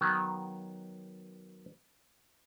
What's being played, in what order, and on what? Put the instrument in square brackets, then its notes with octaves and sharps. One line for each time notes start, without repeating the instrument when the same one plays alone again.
[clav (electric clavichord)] D#3 F#3 B3